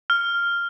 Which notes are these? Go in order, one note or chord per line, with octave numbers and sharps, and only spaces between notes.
F6